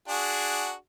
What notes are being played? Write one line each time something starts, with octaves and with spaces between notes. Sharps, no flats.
D4 F#4 G#4